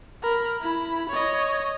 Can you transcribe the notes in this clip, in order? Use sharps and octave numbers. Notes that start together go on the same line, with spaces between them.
A#4 B5
E4 B5
C#5 D#5